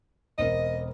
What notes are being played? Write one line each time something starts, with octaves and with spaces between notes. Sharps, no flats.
E1 C4 A#4 D#5